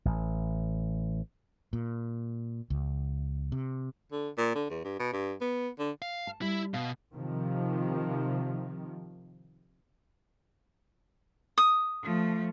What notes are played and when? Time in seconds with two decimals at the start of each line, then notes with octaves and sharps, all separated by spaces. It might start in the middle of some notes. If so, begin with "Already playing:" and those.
0.05 A1
1.73 A#2
2.70 C#2
3.52 C3
4.12 D3
4.38 A#2
4.55 D3
4.70 E2
4.84 G2
5.00 B2
5.13 G2
5.41 B3
5.79 D3
6.02 F5
6.27 A5
6.42 G3 E4
6.74 B2 F5
7.16 C3 D#3 F3
11.58 D#6
12.03 F3 A3